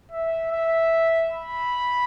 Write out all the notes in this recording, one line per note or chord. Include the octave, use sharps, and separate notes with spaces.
E5
E5
B5